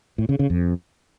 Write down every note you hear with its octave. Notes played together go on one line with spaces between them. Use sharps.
A2
C#3
C#3
F2